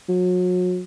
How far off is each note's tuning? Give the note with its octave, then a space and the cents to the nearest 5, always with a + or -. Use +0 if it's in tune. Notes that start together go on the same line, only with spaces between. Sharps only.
F#3 -35